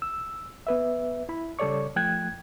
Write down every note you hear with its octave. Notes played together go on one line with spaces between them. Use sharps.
E6
B3 B4 E5
E4 B5
C#3 G3 A4 C#5 D5 C#6
F3 A3 G5 F#6 G#6